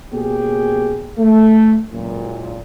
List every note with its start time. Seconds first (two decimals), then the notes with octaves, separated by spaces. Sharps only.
0.12 B2 A#3 C#4 G4 G#4
1.18 A3
1.90 F#1 C#2 A#2